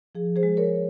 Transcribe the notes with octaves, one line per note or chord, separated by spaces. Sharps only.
F3 G#4
G#4 C5
G#3
A#4 C#5